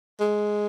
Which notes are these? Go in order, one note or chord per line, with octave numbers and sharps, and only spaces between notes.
G#3